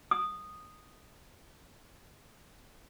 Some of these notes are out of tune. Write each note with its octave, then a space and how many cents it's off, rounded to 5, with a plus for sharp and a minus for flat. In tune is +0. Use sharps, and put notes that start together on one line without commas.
D#6 -10